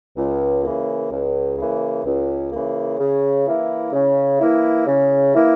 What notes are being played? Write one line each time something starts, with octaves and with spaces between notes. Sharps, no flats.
C#2
C#3 E3 A#3
C#2
C#3 E3 A#3
C#2
C#3 E3 A#3
C#3
E3 A#3 E4
C#3
E3 A#3 E4
C#3
E3 A#3 E4